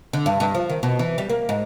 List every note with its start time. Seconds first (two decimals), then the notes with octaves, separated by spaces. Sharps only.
0.13 D3
0.26 G2
0.40 G2
0.55 F3
0.70 D#3
0.83 B2
0.99 E3
1.18 G3
1.30 A#3
1.49 G#2